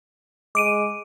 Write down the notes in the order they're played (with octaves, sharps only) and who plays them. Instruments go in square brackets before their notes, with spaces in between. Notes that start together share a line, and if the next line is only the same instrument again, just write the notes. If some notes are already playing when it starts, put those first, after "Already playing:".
[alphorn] G#3 [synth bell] D6 D7 D#7